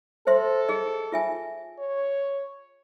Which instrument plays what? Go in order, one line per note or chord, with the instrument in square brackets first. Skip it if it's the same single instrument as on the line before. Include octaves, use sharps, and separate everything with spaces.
[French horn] A4 [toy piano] C5 E5 C6
[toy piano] G#4 D#5
F4 E5 G#5
[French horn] C#5